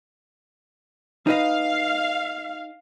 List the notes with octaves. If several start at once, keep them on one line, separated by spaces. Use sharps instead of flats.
D#4 B4 D#5 F5